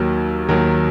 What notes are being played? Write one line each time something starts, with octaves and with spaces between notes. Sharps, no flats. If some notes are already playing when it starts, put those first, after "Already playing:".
Already playing: D#2 D#3 F#3
D#2 D#3 F#3